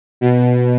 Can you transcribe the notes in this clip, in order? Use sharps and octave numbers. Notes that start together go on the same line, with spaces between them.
B2